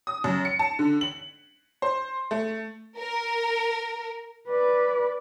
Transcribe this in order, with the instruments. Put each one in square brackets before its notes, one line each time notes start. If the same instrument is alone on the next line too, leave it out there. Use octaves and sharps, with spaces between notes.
[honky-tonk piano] D#6
F#2
C#7
A5
D3
F#7
C5
A3
[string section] A#4
[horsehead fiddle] B4 D5